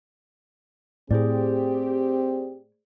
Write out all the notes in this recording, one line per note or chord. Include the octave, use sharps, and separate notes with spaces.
A2 C4 G4 G#4 C5 D5